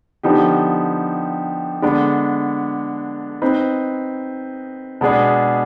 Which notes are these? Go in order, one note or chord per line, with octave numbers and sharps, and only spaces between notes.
D3 F3 B3 D#4 G4
D3 G#3 B3 D4
C4 D#4 B4 D#5
B2 G#3 B3 D4 G#4